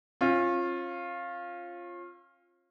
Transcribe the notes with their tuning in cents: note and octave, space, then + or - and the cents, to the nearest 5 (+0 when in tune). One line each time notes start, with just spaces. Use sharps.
C#4 -40 F4 +0